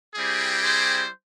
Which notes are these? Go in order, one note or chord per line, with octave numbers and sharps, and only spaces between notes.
G3 C4 E4 G4 G#4
G#4 C5